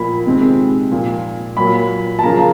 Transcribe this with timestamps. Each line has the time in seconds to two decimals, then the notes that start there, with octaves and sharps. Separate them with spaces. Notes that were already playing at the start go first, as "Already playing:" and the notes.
Already playing: A#2 F3 A#3 B5
0.26 C3 D#3 G#3 C4
0.91 A#2 F3 A#3
1.57 A#2 F#3 A#3 B5
2.19 A5
2.23 C#3 F3 A#3 A#5